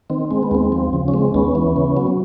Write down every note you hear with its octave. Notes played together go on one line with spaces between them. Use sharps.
D#3 C4
G#3 C4
B3
D#2 C4
F3
C#3
C#4
G#3 C4
D#2 B3 C#4
E3
C#3
F#3